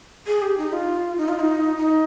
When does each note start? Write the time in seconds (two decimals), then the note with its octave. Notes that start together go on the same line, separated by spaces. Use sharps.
0.27 G#4
0.42 G4
0.58 D#4
0.73 F4
1.18 D#4
1.29 F4
1.39 D#4
1.77 D#4